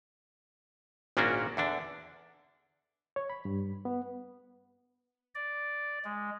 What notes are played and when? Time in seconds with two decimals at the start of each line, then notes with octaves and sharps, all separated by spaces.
1.17 G#1 A#2 A#3 C#4 D4 F#4
1.57 E2 D3 D4
3.16 C#5
3.30 B5
3.45 G2
3.85 B3
5.35 D5
6.05 G#3